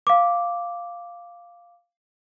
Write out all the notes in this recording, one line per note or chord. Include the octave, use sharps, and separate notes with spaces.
F5 D6